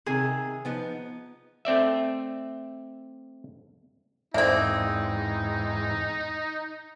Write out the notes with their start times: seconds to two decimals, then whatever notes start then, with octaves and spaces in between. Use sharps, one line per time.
0.06 C3 D#3 G#4
0.65 F3 B3 D#4
1.65 A3 C4 D5 E5
4.34 E2 G#2 A#3 C4 D#4 D5 E5